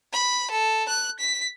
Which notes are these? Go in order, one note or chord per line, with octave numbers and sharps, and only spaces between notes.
B5
A4
F#6
B6